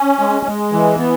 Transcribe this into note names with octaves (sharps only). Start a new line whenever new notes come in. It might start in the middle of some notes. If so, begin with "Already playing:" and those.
Already playing: C#4
G#3
G#3
E3
B3